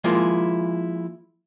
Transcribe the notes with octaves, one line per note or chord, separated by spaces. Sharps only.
F3 G#3 A#3 E4 F4